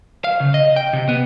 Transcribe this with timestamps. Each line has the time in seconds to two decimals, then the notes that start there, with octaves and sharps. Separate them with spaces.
0.24 F5
0.40 C#3
0.54 D#5
0.76 G5
0.93 C3
1.09 B3